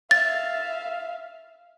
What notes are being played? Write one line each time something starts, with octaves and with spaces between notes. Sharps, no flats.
E5 F5 A6